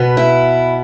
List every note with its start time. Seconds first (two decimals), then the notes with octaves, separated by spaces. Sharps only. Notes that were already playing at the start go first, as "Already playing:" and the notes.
Already playing: B2 B3
0.17 E4